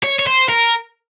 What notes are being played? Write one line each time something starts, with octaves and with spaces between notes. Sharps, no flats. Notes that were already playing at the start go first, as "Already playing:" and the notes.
C#5
C#5
C5
A#4